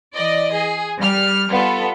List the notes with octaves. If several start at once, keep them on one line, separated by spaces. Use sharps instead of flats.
E3 D5 D#5
G#4
G3 F6
G3 B3 F4 A4